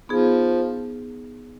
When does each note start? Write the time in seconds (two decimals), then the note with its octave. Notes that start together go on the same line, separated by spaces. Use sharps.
0.09 F3 B3 D#4 G#4